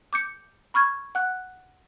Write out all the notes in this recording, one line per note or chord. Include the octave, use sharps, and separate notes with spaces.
D6 G6 C#7
B5 C#6 F6 G#6
F#5 F#6